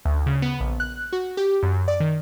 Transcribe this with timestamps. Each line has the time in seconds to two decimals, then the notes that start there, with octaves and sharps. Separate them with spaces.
0.05 D2
0.26 C#3
0.42 B3
0.60 A#1
0.80 F#6
1.13 F#4
1.37 G4
1.63 F#2
1.88 D5
2.00 D#3